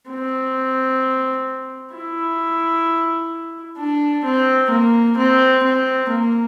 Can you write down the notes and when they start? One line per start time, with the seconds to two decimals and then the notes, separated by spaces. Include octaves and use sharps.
0.10 C4
1.94 E4
3.78 D4
4.25 C4
4.71 A#3
5.17 C4
5.64 C4
6.09 A#3